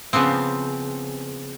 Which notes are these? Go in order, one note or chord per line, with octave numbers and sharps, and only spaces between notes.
C#3 F3 B3 C4